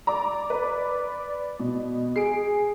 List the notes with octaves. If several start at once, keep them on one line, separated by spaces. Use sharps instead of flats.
D5 A#5 D6
B4
B2
G#4 C7 D7